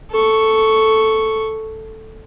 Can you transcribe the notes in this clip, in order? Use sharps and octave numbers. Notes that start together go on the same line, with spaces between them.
A4 C#6